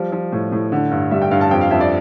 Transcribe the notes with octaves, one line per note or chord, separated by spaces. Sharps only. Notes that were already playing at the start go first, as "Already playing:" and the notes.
Already playing: F3 G3
F3
A2
A2
D3
G2
G3 E5
G5
G2 F5
A5
F2 G5
F5
F2 E5
D5